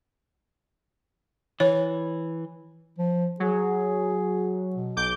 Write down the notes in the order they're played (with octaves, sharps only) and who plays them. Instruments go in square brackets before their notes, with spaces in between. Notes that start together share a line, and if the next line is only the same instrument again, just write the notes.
[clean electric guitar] E3 [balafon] C#5
[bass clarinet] F3
[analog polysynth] F#3 [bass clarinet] G#4
[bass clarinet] B2
[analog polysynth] B1 D6 G6